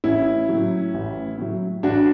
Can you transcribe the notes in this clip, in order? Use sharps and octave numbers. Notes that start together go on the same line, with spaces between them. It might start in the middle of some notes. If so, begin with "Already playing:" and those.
A1 C#4 E4
A2 F#3
A1
A2 F#3
A1 D4 F#4